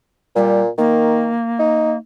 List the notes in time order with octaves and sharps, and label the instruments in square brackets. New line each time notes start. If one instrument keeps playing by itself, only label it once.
[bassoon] A#2 [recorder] G3
[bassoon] D#3 [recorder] A#3
[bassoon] D#4